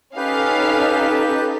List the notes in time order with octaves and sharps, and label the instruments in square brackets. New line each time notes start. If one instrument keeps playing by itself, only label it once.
[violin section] C#4 F5 [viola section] D#4 A4 [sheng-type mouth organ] G4 B4